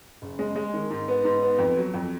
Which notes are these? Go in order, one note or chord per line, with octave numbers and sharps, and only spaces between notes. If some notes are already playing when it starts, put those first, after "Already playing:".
F#1
G#3
G#3
D#3
G#2
B3
G#2
B3
F2
F#3
F2